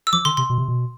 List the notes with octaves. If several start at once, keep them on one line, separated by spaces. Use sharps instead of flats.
E6
F3 D6
D3 C6
C3 C6
B2
C3
B2